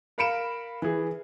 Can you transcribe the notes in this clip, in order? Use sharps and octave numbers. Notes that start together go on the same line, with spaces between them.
A#4 F5 B5 C#7 D7 E7
E3 G#4